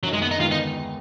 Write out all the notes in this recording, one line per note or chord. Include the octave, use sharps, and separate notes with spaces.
F#1 F#2 D#3 F#3
G#3
B3
D#4
D#2 D3 G#3 B3 F4
D#4